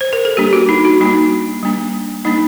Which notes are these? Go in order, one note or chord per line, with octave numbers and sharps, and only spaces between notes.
C5
A#4
A4
G3 A#3 D4 G4
F#4
D#4
F#4
G3 A#3 D4 D#4
G3 A#3 D4
G3 A#3 D4 D#4